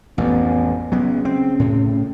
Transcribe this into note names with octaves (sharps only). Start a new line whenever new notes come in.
A1 F2 B3
C#3 F#3 B3
C4
A2